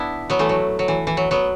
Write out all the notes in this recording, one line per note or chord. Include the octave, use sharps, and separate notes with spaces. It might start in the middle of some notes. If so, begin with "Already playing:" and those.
Already playing: B3 D4 E4
F#3 B3
E3 A3
F#3
F#3
E3
E3
F#3
F#3 B3